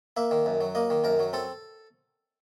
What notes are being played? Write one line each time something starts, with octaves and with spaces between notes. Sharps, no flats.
A#3 E5
D#3
F#2
F#3
A#3 D#5
D#3
F#2 A#4
F#3
C4 A4